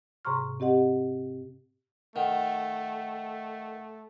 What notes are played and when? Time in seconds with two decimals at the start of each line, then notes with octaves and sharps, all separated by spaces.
0.25 G#2 C3 A#5 C6 C#6 F6
0.60 C4 G4 D#5 F#5
2.16 D#3 A3 F#5